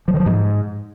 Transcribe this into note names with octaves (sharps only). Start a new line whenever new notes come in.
F3
D#3
F3
G#2